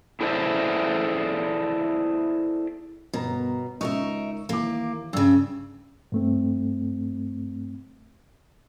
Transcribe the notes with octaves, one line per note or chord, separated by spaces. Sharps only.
E4 G#4 A4 C5 D5 E5
G1 B2 A#4 A#5
C#2 D#4 A#4 E5 C#6
D#2 E3 A#3 D6
G2 C#3 E6
G2 A3 C4